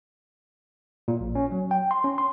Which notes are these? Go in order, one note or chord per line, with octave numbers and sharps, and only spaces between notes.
A#2
A#1
C#4
F#3
G5
C6
C#4
C6